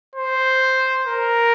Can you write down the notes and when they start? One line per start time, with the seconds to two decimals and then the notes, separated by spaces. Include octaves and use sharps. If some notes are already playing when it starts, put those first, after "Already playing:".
0.16 C5
1.06 A#4